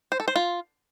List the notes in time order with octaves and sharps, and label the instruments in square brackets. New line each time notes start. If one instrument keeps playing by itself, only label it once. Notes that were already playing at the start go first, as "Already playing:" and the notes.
[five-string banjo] C5
A4
C5
F4